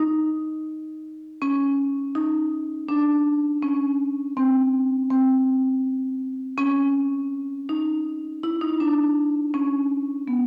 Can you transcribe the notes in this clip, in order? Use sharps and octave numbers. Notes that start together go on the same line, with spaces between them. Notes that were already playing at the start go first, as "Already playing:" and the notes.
Already playing: D#4
C#4
D#4
D4
C#4
C4
C4
C#4
D#4
E4
D#4
D4
C#4
B3